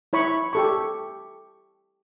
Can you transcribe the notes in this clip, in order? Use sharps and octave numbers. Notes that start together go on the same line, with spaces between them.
E4 C#5 B5 C#6
G4 A4 C#6